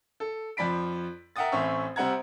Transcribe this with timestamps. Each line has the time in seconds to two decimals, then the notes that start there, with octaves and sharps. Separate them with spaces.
0.20 A4
0.57 F2 F3 D5 B5 B6 D7
1.36 A#4 E5 F#5 G5 D#6 A6
1.52 A1 A2 C4 C#4 E5 C#6
1.96 C3 G3 C4 F#5 A#5 G#6